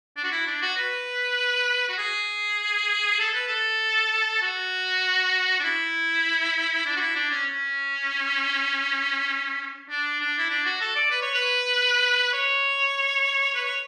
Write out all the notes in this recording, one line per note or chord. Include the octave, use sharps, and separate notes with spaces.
D4
F#4
E4
D4
F#4
B4
F#4
G#4
A4
B4
A4
F#4
D4
E4
D4
F#4
E4
D4
C#4
C#4
D4
D4
E4
D4
F#4
A4
D5
B4
C#5
B4
C#5
B4
C#5